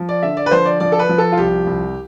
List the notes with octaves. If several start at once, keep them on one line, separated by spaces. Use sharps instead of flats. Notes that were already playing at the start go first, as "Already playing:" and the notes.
Already playing: F3
D5
D3 E5
D5
B4
F3 C5
D5
F3 D5
A4
B4
F3
A4
F4
C2 G4
C2